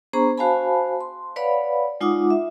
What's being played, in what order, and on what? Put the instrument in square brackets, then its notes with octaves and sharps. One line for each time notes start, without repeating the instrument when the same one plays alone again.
[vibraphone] B3 D4 G#4 C5 A#5 C#6
F#4 C5 F5 G#5 A5 B5
C6
B4 C#5 D5 F5 F#5 B5
G#3 D#4 F4 F#5 D6 D#6
E5